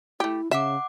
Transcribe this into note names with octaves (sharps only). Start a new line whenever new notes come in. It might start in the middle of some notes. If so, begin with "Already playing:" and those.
A3 E4 G4
C#3 E5 F#5 D6